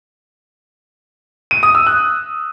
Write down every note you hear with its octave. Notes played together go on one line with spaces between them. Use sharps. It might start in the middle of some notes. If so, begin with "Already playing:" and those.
D#7
D#6
E6
F#6